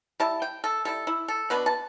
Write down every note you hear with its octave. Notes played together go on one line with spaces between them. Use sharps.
G3 E4 A5
G5
A4
G3 E4 A4
E4
A4
B2 B3 D4 B4
A5